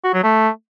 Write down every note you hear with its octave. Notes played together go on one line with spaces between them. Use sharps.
F#4
F#3
A3